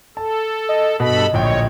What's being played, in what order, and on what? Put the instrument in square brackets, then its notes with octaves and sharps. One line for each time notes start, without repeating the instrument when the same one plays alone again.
[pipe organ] A4 [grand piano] A5
[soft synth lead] D#5
[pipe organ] G2 A4 B5 [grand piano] B2 [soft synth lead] D#5
[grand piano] D1 A#1 G5 [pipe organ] C#5